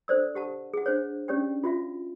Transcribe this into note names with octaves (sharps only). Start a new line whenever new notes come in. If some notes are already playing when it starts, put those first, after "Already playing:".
D4 A4 C5 D5 E6
G4 F#5 A5
G#4 F#5
D4 C5 C#5
C#4 D4 G4 C#5 D5 G5
F4 F#4 E5 F5